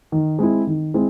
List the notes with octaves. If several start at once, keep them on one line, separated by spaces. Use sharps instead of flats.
D#3
G#3 C4 E4
D#3
G#3 C4 E4